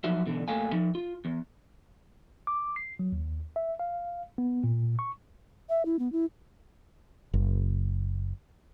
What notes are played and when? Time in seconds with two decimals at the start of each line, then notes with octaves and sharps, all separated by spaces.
0.04 F3 F#3 D#4 F#4 E5
0.26 B2 D3 E3
0.48 A2 A#3 A4 F5 G5 G#5
0.72 F3 D#4
0.95 F4
1.25 E2
2.47 D6
2.76 C7
2.99 F#3
3.12 D#2
3.56 E5
3.79 F5
4.38 B3
4.64 A#2
4.99 C#6
5.69 E5
5.85 E4
5.99 B3
6.12 E4
7.34 F#1